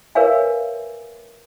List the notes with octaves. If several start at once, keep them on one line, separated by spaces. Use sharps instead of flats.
A#4 B4 C#5 E5 F5 G#5